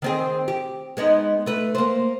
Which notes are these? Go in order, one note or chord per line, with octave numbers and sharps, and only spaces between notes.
D#3 C4 G#4
G4
G#3 B3 D#4
A3 B4
A#3 C5